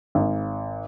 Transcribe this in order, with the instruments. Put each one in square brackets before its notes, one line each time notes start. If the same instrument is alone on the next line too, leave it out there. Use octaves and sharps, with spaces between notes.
[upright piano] G#1